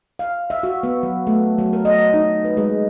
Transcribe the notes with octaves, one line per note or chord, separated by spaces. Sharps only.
F5
E5
F#4
B3
F#3
A3
F#3
A#4
D#5
D#4
B4
G#3